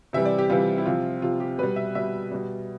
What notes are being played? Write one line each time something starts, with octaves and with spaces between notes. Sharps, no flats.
C3 E3 G3 E5
D5
G4
C3 E3 G3 F4
E4
C3 F3 F4
C3 F3 F4
G4
B2 G3 B4
E5
B2 G3 E5
B2 G3